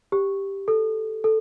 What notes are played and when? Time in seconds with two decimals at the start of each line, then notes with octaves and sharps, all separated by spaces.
0.12 G4
0.68 A4
1.24 A4